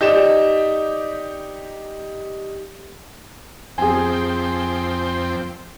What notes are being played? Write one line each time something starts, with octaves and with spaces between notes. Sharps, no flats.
D#4 G4 D5 E7
F2 C4 G#4 G5 G#5